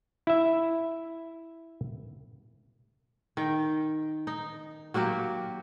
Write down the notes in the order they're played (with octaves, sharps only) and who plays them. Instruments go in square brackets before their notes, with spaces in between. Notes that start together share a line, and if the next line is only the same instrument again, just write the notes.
[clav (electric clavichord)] E4 E5
[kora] D#3 G5
D#4
F#3 A#3 F#4 G4